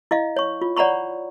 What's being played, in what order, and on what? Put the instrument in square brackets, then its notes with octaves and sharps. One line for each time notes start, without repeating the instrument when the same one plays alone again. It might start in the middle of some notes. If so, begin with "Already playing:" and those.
[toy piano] E4 D#5 F5
C#5 C#6
F4
C#5 D5 F#5 A#5 B5 C#6